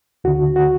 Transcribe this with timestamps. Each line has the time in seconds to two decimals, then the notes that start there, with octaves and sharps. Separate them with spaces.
0.24 D2 D3 F#4
0.56 F#4